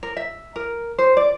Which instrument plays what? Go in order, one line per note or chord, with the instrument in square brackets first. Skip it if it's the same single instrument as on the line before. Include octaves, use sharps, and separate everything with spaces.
[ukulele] A#4
E5
A#4
C5
D5